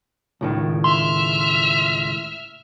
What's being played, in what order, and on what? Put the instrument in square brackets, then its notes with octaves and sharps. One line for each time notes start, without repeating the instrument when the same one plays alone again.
[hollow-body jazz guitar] C#2 A2 D#3
[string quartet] E5 F6 [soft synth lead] C6